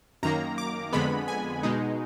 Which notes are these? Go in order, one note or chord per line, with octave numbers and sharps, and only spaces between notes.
F#2 D#3 A#3 A#5
D6
F2 D3 G#3 B3 B5
G#5
B2 G#3 D#4